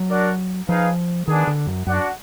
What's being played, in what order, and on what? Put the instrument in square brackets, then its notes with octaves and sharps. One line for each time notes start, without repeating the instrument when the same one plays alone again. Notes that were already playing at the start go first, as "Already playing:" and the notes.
Already playing: [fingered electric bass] F#3
[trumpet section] D4 F#4 A#4 D5 F#5
[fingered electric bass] F3 [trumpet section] D#4 G#4 B4 F5
[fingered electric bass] D#3 [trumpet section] B3 D4 G#4
[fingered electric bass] D3
F#2
[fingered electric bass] F#2 [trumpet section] D4 F#4 D5 F#5